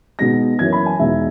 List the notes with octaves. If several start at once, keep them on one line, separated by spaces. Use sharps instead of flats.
B2 G#3 B3 D#4 A#6
F#2 E3 A#3 C#4 E4 G#6
B5
G#5
E2 B2 G#3 D#4 E5